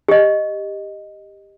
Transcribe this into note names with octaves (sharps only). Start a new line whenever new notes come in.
G4 D#5